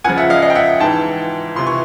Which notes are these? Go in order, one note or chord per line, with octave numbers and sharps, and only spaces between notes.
C#2 C#3 F3 F#5 G#5
E5 F#5
D#5 F5
D#5 F5
G5
E5 F#5
G#2 E3 G5 A5
C#2 C3 E3 C6
C#6